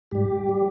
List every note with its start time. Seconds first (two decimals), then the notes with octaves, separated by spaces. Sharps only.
0.11 G#2 G3 G4
0.49 G3